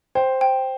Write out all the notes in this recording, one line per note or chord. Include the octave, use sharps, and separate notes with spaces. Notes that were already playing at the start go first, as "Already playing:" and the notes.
C5 G5
G5